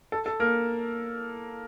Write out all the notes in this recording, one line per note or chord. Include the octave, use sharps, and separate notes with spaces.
A4
A4
A#3 A#4